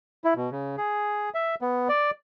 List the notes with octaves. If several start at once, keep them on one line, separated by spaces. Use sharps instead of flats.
E4
B2
C#3
G#4
E5
B3
D5